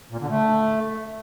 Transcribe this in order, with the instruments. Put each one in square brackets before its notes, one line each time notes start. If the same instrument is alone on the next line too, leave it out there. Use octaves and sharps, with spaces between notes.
[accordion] A#2
D3
A3